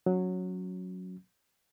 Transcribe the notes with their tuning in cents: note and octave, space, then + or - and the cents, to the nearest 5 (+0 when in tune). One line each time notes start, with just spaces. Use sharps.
F#3 -10 C#4 +0